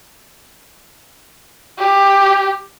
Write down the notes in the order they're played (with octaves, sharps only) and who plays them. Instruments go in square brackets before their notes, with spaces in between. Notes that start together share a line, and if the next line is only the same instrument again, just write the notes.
[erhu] G4